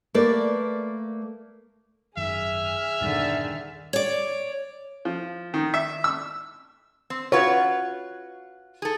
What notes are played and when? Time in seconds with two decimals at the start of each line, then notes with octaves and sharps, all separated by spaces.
0.14 A3 A#3 B4 D5
2.17 G#1 F#2 D#3 G#4 E5 F6
3.01 E2 G2 A#2 D3 D#3
3.93 C#5 D5
5.05 F3
5.54 D#3
5.74 E5
6.04 E6
7.10 C4
7.32 F4 F#4 B4 C#5
8.82 G#4 A4